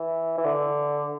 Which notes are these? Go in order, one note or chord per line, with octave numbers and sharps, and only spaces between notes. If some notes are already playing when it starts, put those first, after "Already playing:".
Already playing: E3
E3
D3